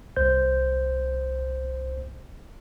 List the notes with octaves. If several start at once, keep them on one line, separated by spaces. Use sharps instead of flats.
C2 C5 G6